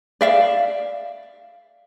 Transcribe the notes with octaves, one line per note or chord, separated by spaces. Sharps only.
D5 E5 F5